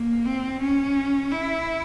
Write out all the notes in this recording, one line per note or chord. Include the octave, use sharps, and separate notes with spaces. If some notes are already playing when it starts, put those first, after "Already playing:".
Already playing: A#3
C4
C#4
E4